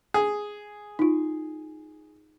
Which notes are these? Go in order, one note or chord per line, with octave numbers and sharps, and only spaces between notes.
G#4
D#4 F4